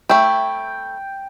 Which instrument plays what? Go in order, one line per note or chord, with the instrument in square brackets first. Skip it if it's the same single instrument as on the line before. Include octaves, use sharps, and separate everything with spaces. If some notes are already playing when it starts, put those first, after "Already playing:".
[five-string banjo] A3 E4 [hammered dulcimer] G5